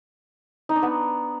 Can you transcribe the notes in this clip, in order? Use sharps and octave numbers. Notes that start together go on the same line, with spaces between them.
D#4
D4
B3